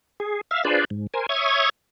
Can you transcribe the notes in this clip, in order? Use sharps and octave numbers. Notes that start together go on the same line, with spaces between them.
G#4
E5 F5
D4 F4 G#4 B4 C5 D5
G#2
A#4 C5 G#5
C#5 E5 C#6 D#6 G#6